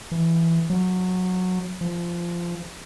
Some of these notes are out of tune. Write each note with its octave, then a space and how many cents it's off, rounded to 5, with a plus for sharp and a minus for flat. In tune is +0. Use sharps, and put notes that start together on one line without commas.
E3 +10
F#3 -15
F3 -15